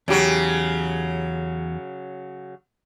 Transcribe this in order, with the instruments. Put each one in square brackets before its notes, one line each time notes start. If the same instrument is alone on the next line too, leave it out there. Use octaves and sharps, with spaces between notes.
[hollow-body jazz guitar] E2 G4 [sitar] C#3 F#3